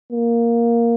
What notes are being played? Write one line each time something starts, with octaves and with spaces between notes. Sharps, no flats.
A#3